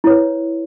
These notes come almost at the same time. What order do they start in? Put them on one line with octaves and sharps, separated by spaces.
E4 C#5 B4